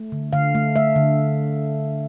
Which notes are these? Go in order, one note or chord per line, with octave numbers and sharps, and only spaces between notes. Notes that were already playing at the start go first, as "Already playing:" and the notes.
Already playing: A3
D3
D3 F5
A3
A3 E5
D3